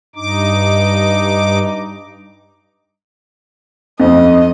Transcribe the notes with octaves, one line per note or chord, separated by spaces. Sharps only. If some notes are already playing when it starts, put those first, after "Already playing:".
G2 D#4 D6
F2 D#5